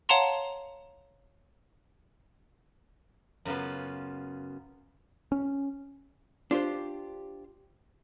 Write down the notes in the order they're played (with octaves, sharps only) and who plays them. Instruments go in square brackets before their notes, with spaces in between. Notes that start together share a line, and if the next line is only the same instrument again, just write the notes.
[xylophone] C#5 F5 F#5 A5 A#5 C6
[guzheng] F#2 C#3 B3 F4
[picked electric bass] C#4
[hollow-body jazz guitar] D4 F4 G4 C5